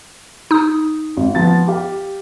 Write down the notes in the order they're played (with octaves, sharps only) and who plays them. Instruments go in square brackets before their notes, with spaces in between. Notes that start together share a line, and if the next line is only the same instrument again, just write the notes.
[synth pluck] D#4 D#6
[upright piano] G#1
F3 B3 A6
G4 F5